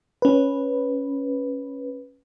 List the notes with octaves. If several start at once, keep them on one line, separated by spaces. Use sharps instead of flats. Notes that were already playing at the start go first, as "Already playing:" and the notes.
C#4 B4